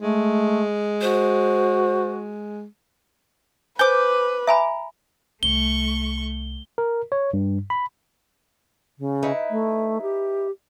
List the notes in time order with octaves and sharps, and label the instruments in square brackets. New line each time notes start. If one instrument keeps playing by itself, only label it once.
[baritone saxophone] G#3 [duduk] A3
[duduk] F#4 [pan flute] C5
[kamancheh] B4 [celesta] C5 G#5 [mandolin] D6 G6
[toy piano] E5 G#5 B5 [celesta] A#5
[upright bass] C2 [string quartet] A3 C#6 [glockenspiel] G7
[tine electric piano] A#4
C#5
G2
B5
[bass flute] C#3
[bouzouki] D#4 E4 B4
[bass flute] A3
G4